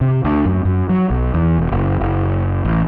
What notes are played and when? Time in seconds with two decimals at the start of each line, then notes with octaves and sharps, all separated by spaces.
0.01 C3
0.25 D2
0.46 F#2
0.65 F#2
0.89 F#3
1.10 B1
1.34 E2
1.58 E1
1.72 F#1
2.01 F#1
2.65 A1